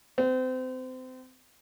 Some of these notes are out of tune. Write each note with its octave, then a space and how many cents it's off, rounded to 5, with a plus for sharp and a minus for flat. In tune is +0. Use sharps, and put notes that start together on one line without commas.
C4 -30